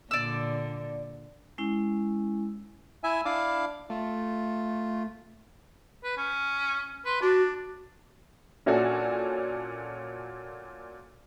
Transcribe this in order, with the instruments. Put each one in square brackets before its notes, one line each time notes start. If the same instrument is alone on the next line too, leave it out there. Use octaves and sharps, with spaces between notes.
[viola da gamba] A#2 D3 [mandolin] D5 E6
[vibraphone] G#3 C#4 E4
[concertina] E4 E5 G#5
[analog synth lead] D4 [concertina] E4 F5 D6
[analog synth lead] A3 [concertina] F4
[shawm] B4
C#4
[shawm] B4 [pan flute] C6
[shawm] D4 [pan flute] F#4
[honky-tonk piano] A#2 C#4 D4 F#4 A4